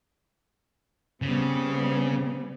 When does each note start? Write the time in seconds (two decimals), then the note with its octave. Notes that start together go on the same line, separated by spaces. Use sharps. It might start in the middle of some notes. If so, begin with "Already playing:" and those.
1.22 C#3 G3 B3 C4